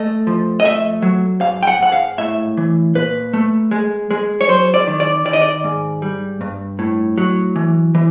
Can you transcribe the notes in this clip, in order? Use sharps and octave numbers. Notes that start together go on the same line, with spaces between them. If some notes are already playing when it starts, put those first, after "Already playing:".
Already playing: A3 D#5
F3
D#5
A3 E5
F#3
G#2 F5
G5
F#5
G#2 F#5
F5
A2 E5
E3
A#2 B4
A3
G#3
G#3
C#5
F#3 C5
D5
D#3
D5
D#3 D5
D#5
D5
G#2
G3
G2
A2
F#3
E3
E3